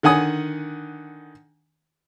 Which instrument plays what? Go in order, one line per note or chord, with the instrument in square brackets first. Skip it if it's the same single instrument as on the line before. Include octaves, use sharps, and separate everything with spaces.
[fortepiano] D3 D#3 F#5 G#5 D#6